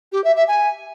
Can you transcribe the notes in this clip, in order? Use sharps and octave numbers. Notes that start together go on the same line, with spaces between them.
G4
E5
E5
G#5